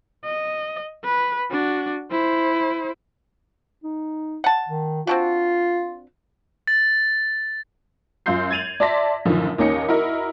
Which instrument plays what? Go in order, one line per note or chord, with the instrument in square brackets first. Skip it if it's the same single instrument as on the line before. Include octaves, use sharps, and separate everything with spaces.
[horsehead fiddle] D#5
B4
D4 F#4
E4 C5
[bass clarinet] D#4
[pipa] F#5 A5
[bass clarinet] D#3
[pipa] C4 D4 F#4 [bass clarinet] F4
[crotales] A6
[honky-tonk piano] F#2 F4 C6 G6 C7
G#6 A6 D#7 F7 F#7
D5 E5 A5 C6 A#6 B6
F#2 A2 D3 D#3 F3
D#2 A#3 C#4 D#4 C#7
E4 F#4 A#4 D#5